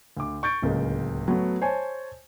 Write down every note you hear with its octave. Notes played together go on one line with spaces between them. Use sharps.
D2 D6
C#6 G6 A6 D7
D1 C#2 C#3 A#3
F#3 A3 B3 F#4
C5 C#5 G#5 A5